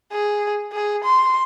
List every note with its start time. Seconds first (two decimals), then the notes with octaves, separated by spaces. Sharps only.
0.12 G#4
0.73 G#4
1.04 C6